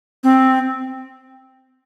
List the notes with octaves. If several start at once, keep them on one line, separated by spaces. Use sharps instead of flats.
C4